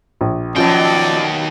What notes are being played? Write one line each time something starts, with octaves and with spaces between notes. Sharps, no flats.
A#1
D#2 B2 F3 F#3 C#4 D5 G5